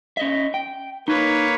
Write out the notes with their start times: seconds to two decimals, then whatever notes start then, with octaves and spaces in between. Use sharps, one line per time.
0.17 C#4 D#5 E5
0.54 G5
1.08 A#3 D#4 B4 C#5